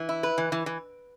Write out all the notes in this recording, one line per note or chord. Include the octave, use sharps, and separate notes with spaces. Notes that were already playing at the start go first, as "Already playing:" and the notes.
Already playing: E3
E4
B4
E3
E3
E3